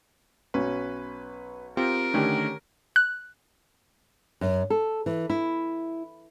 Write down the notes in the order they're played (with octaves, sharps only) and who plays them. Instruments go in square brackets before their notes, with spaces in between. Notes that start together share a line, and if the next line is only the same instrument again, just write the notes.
[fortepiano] B1 C#4 [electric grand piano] B4
[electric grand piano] C4 F4 G4 [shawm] A#4
[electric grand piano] D3 D#3 A3 [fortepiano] C#4 G4
[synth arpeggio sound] F#6
[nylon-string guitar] F#2
A4
E3
E4